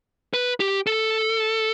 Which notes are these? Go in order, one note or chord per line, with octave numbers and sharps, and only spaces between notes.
B4
G4
A4